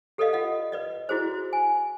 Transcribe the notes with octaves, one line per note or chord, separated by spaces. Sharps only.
G4 A4 B4 D5 D#5 F5
F4 D#5 F#5
B4 D5 D#5
E4 F#4 G#4 C5
G#5